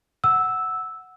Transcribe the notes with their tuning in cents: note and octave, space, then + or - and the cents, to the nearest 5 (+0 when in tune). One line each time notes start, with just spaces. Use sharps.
F#5 -5 E6 -5